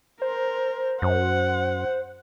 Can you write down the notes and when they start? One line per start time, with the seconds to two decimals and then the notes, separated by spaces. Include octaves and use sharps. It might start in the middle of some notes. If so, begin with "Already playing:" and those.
0.22 A#4 C5
1.02 F#2 F#5